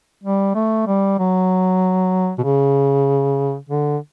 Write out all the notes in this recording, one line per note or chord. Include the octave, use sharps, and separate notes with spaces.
G3
A3
G3
F#3
B2
C#3
D3